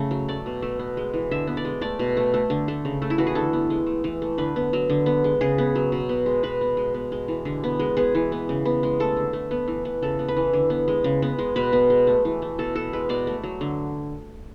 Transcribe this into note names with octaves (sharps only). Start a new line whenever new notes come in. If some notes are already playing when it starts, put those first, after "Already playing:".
Already playing: C#3 A3
F#3
A3 D5
B2
A3
B3
G#3
E3
D3 E5
B3
D5
G#3
A3 D5
B2
A3
A3
D3
A3
C#3
A3
E4
E3 F#4
G#4
D3 A4
B3
G#3
A3
E3
A3
D3 B4
B3
F#3
D3
B3
G#3
C#3 G#4
B3
F#3
B2
B3
G#3
B2 B4
B3
G#3
B3
G#3
E3
D3
B3
G#3
B3 G#4
E3
B3
C#3
B3
G#3
A3 A4
D3
A3
B3
E3
B3
C#3 A4
B3
B4
E3
D3
B3
G#3
C#3
B3
G#3
B2 B4
B3
G#3
A3
E3
A3
B2 A4
B3 A4
G#3 B4
B2 D5
A3
F#3
D3